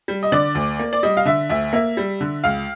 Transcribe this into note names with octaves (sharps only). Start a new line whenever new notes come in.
G3
D#5
D3 D5
D2
A#3
D5
G3 D#5
F5
D3 E5
D2 E5
A#3 E5
G3
D3
C#2 F5